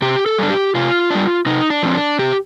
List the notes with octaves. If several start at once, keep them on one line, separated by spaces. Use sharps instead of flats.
C3 G4
A4
G3 D4
G4
C3 F4
G3 D4
C3 D#4
D4
F3 C4
D4
C3 G4